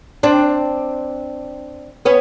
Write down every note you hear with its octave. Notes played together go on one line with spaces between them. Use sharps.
C4 D4
B3 C#4